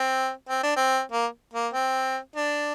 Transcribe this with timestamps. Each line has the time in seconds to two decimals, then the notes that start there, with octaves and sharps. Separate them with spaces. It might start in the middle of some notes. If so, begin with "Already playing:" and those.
Already playing: C4
0.49 C4
0.63 D4
0.76 C4
1.12 A#3
1.53 A#3
1.73 C4
2.36 D4